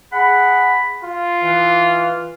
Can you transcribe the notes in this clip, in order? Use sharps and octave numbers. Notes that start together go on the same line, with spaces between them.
G#4 F#5 B5
F4
E3